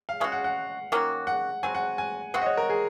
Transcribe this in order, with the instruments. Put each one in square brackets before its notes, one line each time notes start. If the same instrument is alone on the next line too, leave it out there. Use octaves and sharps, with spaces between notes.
[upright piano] F5
[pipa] G#3 C#4 F#4 [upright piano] F5
[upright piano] F#5
F#5
[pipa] D#3 A#3 C#4 F#4
[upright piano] F#5
[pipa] F#3 C4 F#4 [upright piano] G#5
[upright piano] F#5
G#5
[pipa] G#3 C4 F#4 [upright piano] F#5
[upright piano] D#5
C#5
A#4
G#4